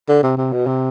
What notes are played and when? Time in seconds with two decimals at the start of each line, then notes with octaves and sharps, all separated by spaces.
0.09 D3
0.23 C3
0.37 C3
0.53 B2
0.67 C3